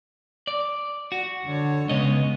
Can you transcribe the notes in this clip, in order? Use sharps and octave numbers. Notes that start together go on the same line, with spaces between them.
D5
F#4
D3 C#5
C#3 G#3 B3 C#5 D#5